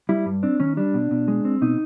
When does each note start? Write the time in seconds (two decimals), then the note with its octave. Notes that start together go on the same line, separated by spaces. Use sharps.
0.09 G3 E4
0.26 G2
0.43 C4 D4
0.60 D#3 C#4
0.77 G3 D4
0.94 B2
1.11 B2
1.28 G#3
1.45 C4
1.61 B2 D#4